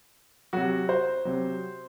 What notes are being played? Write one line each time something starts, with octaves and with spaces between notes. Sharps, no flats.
C3 F#3 F#4
C5
C3 F#3